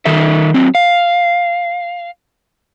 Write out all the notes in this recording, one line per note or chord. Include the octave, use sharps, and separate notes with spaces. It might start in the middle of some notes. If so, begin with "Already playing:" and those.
D#3 D#4 A4 E5
F#3 C4
F5